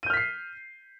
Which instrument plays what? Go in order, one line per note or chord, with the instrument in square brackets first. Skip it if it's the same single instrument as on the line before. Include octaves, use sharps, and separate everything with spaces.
[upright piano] D#7
G6
F6
B6
C7